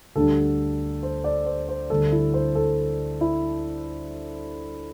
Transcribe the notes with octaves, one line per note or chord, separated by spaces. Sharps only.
D2 D3 G3 A4
C5
D5
C5
C5
D2 D3 G3 A4
E4
C5
A4
E4